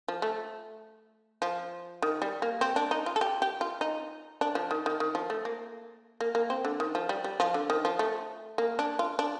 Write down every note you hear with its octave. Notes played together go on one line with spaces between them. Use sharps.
F3
A3
F3
D#3
G3
A#3
C4
D4
D#4
F4
A4
G4
G4
F4
D#4
D4
F3
D#3
D#3
D#3
F3
A3
A#3
A#3
A#3
C4
D3
D#3
F3
G3
G3
F3
D3
D#3
F3
A3
A#3
D4
F4
D4